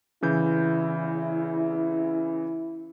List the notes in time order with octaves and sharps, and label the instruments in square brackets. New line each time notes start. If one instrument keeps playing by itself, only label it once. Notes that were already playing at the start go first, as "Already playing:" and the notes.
[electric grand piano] C#3 E3 G6 [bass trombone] E4